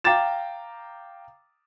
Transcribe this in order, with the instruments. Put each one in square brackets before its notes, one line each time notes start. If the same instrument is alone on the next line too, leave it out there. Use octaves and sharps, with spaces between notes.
[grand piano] F5 G5 A#5 D6 A6 E7